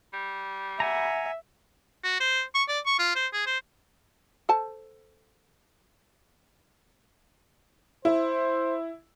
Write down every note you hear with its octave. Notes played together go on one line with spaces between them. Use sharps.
G3
E5 F#5 G#5 A#5
F#4
C5
C#6
D5
C#6
F4
C5
G#4
C5
A4 C5 A5
E4 C5